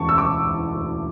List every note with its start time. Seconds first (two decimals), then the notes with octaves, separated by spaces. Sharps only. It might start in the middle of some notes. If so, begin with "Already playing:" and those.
Already playing: E1 D2 A5 C#6
0.09 E6
0.18 E1 D6
0.47 E1
0.74 D2